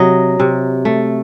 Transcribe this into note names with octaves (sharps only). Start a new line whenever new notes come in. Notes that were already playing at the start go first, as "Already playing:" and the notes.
Already playing: C3 F#3 D#5
C3
A3